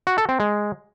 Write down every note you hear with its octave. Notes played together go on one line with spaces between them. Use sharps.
F#4
A4
C4
G#3